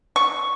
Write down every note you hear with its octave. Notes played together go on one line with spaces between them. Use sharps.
C#6